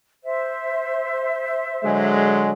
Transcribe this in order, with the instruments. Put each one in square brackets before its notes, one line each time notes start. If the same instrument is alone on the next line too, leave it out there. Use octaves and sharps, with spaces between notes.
[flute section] C5 E5
[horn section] D3 F#3 G#3